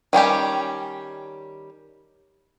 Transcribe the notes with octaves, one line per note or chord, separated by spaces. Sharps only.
D#3 G3 C#4 G4